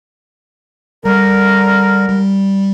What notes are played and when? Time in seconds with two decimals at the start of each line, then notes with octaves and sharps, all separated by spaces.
1.05 D3 G3 A#4
2.09 G3